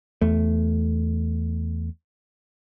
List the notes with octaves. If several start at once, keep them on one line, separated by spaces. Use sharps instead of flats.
E2 A3